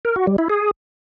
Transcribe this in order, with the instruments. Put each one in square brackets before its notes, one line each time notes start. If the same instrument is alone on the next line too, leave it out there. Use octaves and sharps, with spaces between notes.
[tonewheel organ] A#4
F#4
G3
E4
G#4